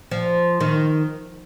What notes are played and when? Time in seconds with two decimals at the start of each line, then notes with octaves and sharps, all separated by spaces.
0.11 F3
0.60 D#3